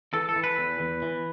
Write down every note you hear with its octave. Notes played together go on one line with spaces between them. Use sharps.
E3 A4
A4
E3
B4
E2
E2
E3